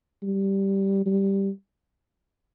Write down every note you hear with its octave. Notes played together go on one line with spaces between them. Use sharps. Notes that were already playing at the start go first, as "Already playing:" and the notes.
G3
G3